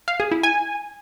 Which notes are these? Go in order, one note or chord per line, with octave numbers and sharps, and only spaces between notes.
F5
G#4
E4
G#5